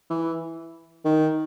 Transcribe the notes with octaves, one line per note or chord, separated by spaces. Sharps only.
E3
D#3